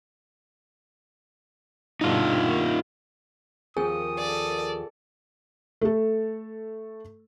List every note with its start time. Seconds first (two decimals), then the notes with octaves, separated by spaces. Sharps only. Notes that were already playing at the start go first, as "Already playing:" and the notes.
2.01 G2 B2 D3 D#4 F4
2.44 D#3 A#3
3.77 D#2 F3 C4 G#4 A#4 G#5 D#6
4.19 A4 D5
5.81 A3 A4